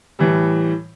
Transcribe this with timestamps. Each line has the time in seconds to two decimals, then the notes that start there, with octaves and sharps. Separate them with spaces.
0.19 A2 E3 G3